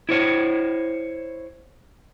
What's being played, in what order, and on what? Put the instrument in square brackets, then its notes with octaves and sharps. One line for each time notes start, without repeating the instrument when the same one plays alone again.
[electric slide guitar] E4 C5 C#5